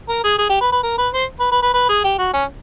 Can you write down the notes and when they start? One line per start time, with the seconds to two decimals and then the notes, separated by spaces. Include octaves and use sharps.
0.09 A#4
0.24 G#4
0.38 G#4
0.49 G4
0.61 B4
0.72 B4
0.83 A#4
0.98 B4
1.14 C5
1.40 B4
1.52 B4
1.62 B4
1.74 B4
1.89 G#4
2.04 G4
2.18 F#4
2.33 C#4